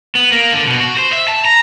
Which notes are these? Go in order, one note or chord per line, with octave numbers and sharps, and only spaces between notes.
B3
A#3
D3
B2
F#4
C5
E5
A5
A#5